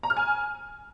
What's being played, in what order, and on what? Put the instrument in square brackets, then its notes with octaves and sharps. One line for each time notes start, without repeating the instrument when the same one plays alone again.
[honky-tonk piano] A#5
F6
G#5